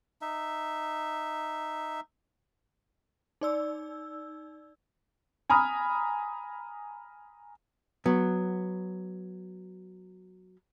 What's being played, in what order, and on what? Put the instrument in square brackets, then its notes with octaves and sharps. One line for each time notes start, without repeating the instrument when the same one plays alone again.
[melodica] D#4 E5
[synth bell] D#4 D5 E6
[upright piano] G#5 A#5 B5 D#6 F6
[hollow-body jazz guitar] F#3 B3